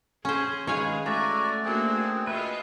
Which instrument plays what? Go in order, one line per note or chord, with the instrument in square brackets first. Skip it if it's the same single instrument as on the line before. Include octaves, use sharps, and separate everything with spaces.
[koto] C#4 C5 [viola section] G#4
[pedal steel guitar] D#3 G#3 B4 [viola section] G#4 [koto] C#5 F5 G#5
[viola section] G#3 G#5 [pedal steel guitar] A3 [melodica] F#4 D5 A#5 [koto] E5
[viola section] A#3 D4 F#4 [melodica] C4 G#4
[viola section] F4 F#4 E5 [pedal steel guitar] B4 D#5